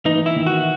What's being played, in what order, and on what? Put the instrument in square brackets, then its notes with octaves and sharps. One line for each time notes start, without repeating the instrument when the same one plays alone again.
[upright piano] E3 [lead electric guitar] D#4
[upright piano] E3
[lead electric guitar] E4
[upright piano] D#3
[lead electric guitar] F#4